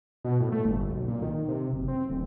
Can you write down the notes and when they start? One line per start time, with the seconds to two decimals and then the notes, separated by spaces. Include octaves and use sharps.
0.25 B2
0.40 A2
0.52 A3
0.65 G1
0.90 B1
1.08 A#2
1.22 D#3
1.49 C3
1.73 F#1
1.88 C4
2.10 D1